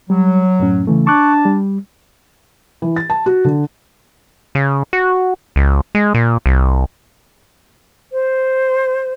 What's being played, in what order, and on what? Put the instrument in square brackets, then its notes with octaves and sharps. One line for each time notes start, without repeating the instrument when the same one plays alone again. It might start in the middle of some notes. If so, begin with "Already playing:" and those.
[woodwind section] F#3 [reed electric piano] G3
[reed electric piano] F#2 A2 C#4
C#3 E3 A3
[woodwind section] D4 A5 [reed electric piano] C#6 D6 F#6
[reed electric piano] G3
[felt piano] E3
A6
A5
F#4
D3
[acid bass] C#3
F#4
C#2
G#3
A#2
C2
[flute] C5